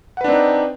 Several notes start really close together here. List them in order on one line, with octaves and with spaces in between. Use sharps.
F#5 B4 D4 C4 D#4